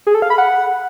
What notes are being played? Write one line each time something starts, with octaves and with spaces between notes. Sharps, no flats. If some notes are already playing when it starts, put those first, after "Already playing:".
G#4
A4
F5
B5
F#5